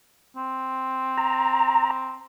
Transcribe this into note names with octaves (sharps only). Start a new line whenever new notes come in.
C4
A#5